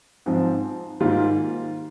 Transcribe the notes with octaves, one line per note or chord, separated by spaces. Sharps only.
G#2 F3 C4
G#2 D#3 G3 A#3 F4